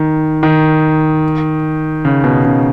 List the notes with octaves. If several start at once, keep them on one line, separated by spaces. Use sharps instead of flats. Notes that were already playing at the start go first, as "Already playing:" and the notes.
Already playing: D#3
D#3
C#3
B2
C#3